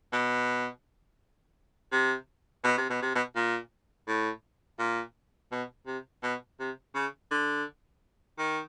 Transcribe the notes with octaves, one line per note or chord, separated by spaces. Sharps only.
B2
C3
B2
C3
B2
C3
B2
A#2
A2
A#2
B2
C3
B2
C3
C#3
D3
D#3